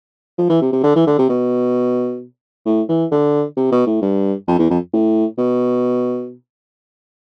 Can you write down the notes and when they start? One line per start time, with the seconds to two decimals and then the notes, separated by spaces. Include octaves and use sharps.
0.38 F3
0.49 E3
0.61 C3
0.73 C3
0.83 D3
0.95 E3
1.07 D3
1.18 C3
1.29 B2
2.66 A2
2.89 E3
3.11 D3
3.57 C3
3.72 B2
3.87 A2
4.02 G2
4.48 F2
4.59 E2
4.70 F2
4.93 A2
5.38 B2